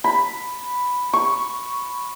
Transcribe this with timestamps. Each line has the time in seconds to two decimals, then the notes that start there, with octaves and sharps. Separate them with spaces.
0.04 B5
1.13 C#6